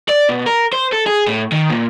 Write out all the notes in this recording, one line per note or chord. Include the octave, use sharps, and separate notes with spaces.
D5
B2
A#4
C5
A4
G#4
A2
D#3
A#2